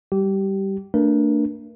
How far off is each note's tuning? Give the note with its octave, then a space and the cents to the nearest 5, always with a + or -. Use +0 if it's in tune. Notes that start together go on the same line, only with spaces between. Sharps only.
G3 +0 G4 -20
A3 +40 D4 +0 A#4 +35